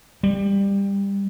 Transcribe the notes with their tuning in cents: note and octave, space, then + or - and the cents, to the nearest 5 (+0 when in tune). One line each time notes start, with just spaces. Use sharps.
G3 +20